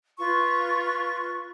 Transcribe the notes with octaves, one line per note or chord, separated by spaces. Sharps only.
F4 B4 C#6